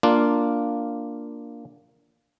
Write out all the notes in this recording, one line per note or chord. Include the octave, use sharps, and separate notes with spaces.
A#3 D4 F4